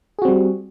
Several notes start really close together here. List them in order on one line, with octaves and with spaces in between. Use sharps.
G#4 F#4 C4 G3